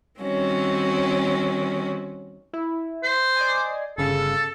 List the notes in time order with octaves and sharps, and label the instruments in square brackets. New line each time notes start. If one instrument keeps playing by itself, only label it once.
[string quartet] D#3 G3 C4 C#4 F#4
[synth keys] E4
[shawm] C5
[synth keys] D5 D#5 G#5
[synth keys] G1 C#3 F5 [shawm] A4